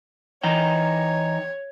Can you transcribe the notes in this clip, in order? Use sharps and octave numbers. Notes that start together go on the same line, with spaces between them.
E3 D#4 C#5 G5